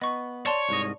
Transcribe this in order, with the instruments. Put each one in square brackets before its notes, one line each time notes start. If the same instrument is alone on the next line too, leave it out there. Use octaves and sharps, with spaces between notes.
[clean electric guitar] B3 [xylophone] D#5 C#6
[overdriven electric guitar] C#5 [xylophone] D5 A5 C6
[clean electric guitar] C2 G#2 D#5